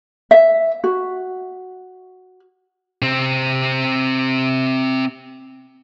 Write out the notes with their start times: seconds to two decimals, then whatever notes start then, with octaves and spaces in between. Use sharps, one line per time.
0.31 E5
0.84 F#4
3.02 C3 C4